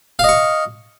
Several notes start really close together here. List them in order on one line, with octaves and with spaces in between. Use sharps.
F5 D#5 C#6